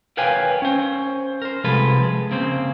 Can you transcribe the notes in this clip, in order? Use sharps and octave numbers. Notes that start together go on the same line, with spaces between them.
A#4 B4 C#5 F5 G5 G#5
C#4 C5
A#4 C5
C2 C3 F3 G#3 A4 B4
G#3
C#3 A#3 C4 C5